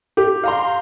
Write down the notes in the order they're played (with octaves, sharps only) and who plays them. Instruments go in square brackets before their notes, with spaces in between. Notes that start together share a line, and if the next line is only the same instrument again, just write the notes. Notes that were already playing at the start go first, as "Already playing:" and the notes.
[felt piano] G4
[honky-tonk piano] F5 A#5 C6